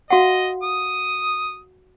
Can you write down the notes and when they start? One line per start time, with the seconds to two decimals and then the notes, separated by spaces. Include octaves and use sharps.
0.10 F#4 D#5 F5 F#5
0.63 D#6